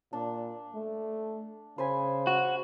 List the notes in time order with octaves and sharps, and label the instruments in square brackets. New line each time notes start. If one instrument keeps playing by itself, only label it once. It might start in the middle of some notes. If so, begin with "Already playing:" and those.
[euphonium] A#2 [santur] D4
[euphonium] A3
[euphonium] C#3 [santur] C5 G#5 B5
[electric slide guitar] F#4